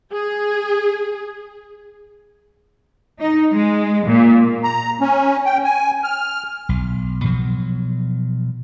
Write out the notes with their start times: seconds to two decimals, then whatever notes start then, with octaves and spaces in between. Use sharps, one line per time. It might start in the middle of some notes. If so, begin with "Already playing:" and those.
0.13 G#4
3.19 D#4
3.51 G#3
4.06 A#2
4.64 A#5
5.01 C#4
5.46 G5
5.64 G#5
6.04 F6
6.69 B1
7.24 B2 F3 F#3